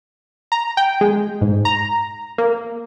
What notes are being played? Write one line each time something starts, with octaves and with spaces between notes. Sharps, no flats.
A#5
G5
G#3
G#2
A#5
A#3